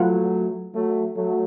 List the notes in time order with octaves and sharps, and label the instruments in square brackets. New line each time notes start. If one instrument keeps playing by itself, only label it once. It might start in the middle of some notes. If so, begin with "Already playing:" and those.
Already playing: [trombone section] F#3 A3 [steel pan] F4 B4 F#5
[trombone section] F#3 A3
F#3 A3